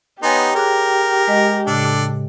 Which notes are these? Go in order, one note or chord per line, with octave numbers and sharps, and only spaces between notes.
B3 D#4 G4 C#5 G#5 C6
G#4 A#4 D6 F#6
G#3 D#5
A2 C#3 D4 A4